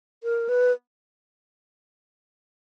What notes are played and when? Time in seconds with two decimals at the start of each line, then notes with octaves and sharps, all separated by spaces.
0.24 A#4
0.49 B4